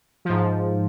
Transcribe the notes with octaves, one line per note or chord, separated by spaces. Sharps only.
G#2 F3